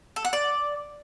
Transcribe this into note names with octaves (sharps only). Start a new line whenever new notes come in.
A4
F#5
D5